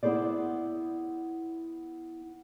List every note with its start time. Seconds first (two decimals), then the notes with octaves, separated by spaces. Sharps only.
0.03 B3 E4 G#4 C5 D5